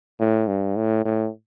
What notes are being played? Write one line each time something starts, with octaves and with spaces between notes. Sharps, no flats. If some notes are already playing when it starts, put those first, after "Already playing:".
A2
G2
A2
A2